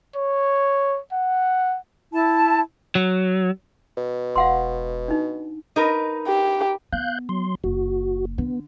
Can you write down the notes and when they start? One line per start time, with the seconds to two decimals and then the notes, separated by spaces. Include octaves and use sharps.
0.16 C#5
1.13 F#5
2.13 E4 A5
2.95 F#3
3.97 B2
4.36 E1 F5 F#5 C6
5.08 D4 D#4
5.76 D#4 A#4 B4
6.28 G4
6.93 B3 F5 F#6 G6
7.29 F#3 C6
7.64 F#1 F#4
8.38 D3 B3